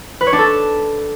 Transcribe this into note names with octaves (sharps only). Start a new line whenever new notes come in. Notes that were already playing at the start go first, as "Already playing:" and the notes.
B4
C#5
D4
A4